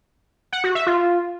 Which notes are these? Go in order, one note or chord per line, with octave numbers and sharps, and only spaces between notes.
F#5
F#4
E5
F4